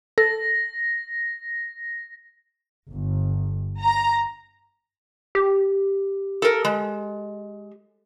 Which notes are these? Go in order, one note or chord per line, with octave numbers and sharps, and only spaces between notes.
A4 A#6
G1
A#5
G4
A4 A#4
G#3